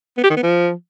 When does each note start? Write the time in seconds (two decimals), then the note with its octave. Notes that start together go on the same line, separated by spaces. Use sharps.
0.17 B3
0.24 G4
0.30 D#3
0.36 B3
0.43 F3